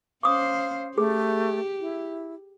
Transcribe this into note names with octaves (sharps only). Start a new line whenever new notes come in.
C#4 C5 F5 D6 D#6
A3 G4 G#4
E4